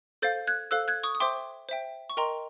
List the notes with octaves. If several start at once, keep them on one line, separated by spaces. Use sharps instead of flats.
A4 C5 F5 G6 A6
F#6 G#6
A4 C5 F5 E6 F#6
F#6 G#6
C#6 D#6
D#6
C5 E5 G5 C6 D6
C5 E5 G5
C#6
A#4 D#5 G5 A#5 C6